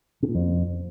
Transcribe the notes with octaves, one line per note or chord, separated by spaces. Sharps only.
C3
A#2
F2